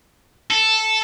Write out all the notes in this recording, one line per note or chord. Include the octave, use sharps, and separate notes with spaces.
A4